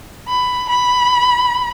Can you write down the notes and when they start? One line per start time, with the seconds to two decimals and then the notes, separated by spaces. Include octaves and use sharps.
0.28 B5
0.69 B5